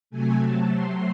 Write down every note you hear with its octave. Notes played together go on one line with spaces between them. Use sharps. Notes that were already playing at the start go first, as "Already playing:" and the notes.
C3 F#3 A3 G#5
A5
C6